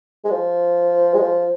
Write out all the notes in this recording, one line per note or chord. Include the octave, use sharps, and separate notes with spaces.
G#3
F3
G#3
F3